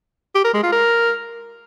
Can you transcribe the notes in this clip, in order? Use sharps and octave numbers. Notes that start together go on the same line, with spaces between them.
G4
A#4
G#3
F4
A#4